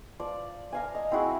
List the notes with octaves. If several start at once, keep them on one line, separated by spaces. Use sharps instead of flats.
F3 D5
A#4 F5 G#5
D#5
C4 E4 F#4 G#4